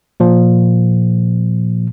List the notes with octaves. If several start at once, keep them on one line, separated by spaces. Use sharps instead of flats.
A#2 F3